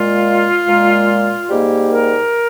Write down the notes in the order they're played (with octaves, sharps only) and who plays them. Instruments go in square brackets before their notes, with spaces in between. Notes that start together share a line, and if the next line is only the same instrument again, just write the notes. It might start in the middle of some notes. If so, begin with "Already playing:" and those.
Already playing: [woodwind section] A#2 G#3 F4
A#2 G#3
G#2 G3 A#3 G4
A#4